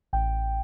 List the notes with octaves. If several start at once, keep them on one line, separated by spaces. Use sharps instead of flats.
A1 G5